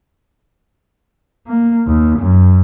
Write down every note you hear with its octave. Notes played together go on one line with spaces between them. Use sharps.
A#3
D#2
F#2